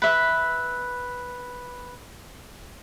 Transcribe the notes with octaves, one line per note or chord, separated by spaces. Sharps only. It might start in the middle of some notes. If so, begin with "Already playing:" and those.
B4 E5